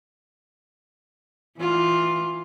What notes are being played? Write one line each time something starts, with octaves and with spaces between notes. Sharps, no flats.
E3 F4